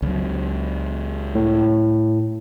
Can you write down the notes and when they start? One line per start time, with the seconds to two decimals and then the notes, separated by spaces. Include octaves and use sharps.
0.02 C#2 F#3
1.35 A2